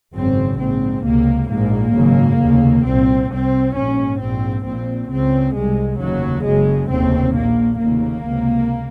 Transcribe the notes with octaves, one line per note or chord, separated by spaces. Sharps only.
G#1 F#2 C#3 C4
A#1 G#2 C4
C#2 C3 A#3
A#1 G#2 A#3
G#1 F#2 C#3
F1 D#2 C#3
C2 A#2 C4
C2 C3 C4
A#1 G#2 C#4
A#1 G#2 C4
A#1 A#2 C4
C#2 C#3 C4
C2 C3 G#3
F1 D#2 C#3 F#3
F#1 F#2 C#3 G#3
F1 D#2 C#3 C4
A#1 A#2 A#3
F1 D#2 C#3 A#3
C#2 C3